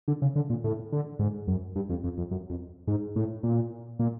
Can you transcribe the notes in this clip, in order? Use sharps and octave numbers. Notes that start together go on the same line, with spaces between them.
D3
C#3
D3
A#2
A2
D3
G#2
F#2
G2
F2
F2
F2
F#2
F2
G#2
A2
A#2
A#2